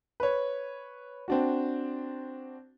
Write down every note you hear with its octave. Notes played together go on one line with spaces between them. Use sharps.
B4 C#5
C4 D4 F#4